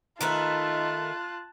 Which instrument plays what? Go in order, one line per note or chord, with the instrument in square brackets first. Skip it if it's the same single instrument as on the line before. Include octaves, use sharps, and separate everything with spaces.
[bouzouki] D#3 A3 B4 [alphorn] D#4 [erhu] F4 [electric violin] A5 F#6